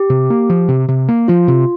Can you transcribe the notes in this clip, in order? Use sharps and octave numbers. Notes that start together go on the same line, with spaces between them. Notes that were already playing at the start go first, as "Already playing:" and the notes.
Already playing: G4
C3
A#3
F3
C3
C3
A#3
F3 F4
C3